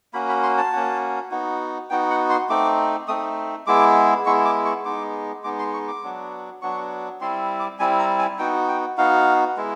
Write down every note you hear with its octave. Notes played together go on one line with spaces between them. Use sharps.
A#3 C#4 F#4 B5
B5
C6
A5
A#3 C#4 F#4
B3 D#4 F#4
B3 D#4 F#4 G5
F#5
C6
A3 C4 D#4 D6
A3 C4 D#4 D#6
G#3 B3 E4 D6
G#3 B3 E4 C#6
D6
C#6
G#3 B3 D#4 D6
G#3 B3 D#4 D6
C6
C#6
D6
F#3 B3 D4 F#4
F#3 B3 D4 F#4 C#6
G3 C4 E4 C6
D6
G3 C4 E4 G#5
A#5
G#5
B3 D#4 F#4 G5
G5
B3 D#4 F#4 F5
G#3 B3 E4